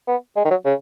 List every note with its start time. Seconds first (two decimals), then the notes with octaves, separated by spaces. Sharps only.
0.07 B3
0.36 G#3
0.45 D#3
0.51 F#3
0.65 C#3